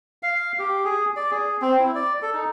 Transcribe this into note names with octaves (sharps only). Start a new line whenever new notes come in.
F5
G4
G#4
D5
G#4
C4
E4
D5
A4
D#4